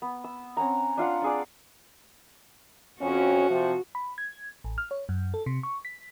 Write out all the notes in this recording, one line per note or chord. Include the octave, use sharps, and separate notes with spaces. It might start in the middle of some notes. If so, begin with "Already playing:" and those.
B3
E6
C4 C#4 F#5 A#5
D4 F4 F5 F#5
D4 G#4 D5
F2 C#4 F#4
C3 F3
B5
G#6
A1
F6
C#5
F#2
A4
C3
C#6
B6